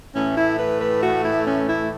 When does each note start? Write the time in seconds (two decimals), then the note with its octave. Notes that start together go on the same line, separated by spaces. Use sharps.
0.15 A2 E3 A3 C#4
0.37 E4
0.59 B4
0.81 B4
1.02 F#4
1.24 E4
1.45 C#4
1.68 E4